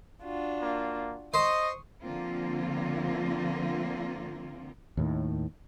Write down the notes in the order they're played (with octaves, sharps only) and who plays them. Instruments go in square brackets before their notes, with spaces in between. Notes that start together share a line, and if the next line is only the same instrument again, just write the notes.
[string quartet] D4 F4 F#4
[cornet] A#3
[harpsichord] C5 [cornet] D#5 [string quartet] C#6 D#6
[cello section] D3 F3 A#3 C4 F4
[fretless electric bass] D#2 A2 D#3